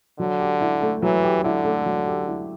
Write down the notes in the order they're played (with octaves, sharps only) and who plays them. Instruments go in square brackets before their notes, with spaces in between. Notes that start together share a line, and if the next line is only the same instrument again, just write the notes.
[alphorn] D3 [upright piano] F#3
[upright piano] G4
E4
A3
[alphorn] E3 [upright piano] F#3
[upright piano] G4
[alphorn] D3 [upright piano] E4
[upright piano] A3
F#3
G4
E4